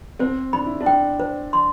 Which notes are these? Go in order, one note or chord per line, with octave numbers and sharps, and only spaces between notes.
C4 C5
D4 B5
E4
D4
G5
C5
C6